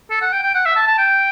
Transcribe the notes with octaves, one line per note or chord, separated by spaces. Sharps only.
A4
F#5
G5
G5
F#5
E5
A5
A5
G5